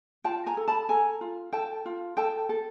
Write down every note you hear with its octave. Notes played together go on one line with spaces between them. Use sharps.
F4 G5 A5
G#5 A#5
A4
A5 B5
A4 G#5 A#5
F4
A4 G5 A5
F4
A4 G5 A5
A4